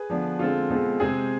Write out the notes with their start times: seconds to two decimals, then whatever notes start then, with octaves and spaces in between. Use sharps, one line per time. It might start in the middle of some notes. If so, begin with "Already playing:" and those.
Already playing: G#4 B4
0.10 D3 F3 B3 D4
0.39 D3 G#3 C4 F4 A4
0.70 B2 G#3 C4
1.00 C3 G#3 C4 G#4